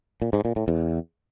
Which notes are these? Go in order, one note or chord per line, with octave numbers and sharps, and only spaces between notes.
A#2
G#2
A#2
A2
E2